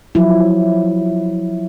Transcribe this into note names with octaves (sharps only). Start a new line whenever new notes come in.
F3 F#3 E4